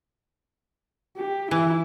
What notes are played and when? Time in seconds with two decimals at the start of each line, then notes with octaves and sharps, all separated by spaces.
1.17 G4
1.51 E3 E4